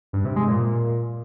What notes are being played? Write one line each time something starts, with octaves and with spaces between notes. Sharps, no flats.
G2
C3
G#3
A#2